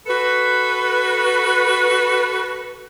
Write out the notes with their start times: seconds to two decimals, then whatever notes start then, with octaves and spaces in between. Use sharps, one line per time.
0.06 F#4 A4 B4